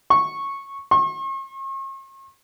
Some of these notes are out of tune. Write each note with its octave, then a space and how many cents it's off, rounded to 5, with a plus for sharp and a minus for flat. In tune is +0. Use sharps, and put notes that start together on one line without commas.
C#6 -10
C#6 -45